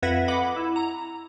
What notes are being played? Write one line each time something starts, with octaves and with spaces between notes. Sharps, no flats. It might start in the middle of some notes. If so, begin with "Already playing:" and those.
F2 B4 E5 F#5 G#6 A#6
D#5 F#5 B5 D6
E4
A#5